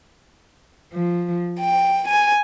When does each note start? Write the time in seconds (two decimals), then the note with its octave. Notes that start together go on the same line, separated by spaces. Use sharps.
0.94 F3
1.59 G5
2.07 G#5